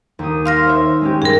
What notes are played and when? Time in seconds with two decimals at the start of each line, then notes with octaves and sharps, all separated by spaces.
0.19 D#2 D#6
0.46 F5 C6 F6 A#6
0.66 C5 C#5 E5
1.01 G#3 C#4 G4
1.22 G2 G#4 A#4